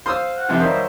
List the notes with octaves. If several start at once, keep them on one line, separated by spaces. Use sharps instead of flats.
C5 F5 C6 D#6 E6
F#5
F2 C3 E3
D#3 F#3 G3 C5 D#5 E5